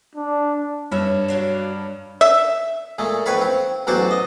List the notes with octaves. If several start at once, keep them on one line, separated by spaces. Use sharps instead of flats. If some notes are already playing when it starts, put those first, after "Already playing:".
D4
G2 C#5 E5
F#3 D4 F5
E5
A#2 G#3 A3
F2 A2 B4 C#5 F5 B5
C4
A1 E2 F#3 F#4 C5 D5
D#5